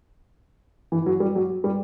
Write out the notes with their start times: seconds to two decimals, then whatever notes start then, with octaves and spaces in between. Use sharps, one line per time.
0.92 E3
1.06 F#3
1.20 G3
1.35 F#3
1.64 G3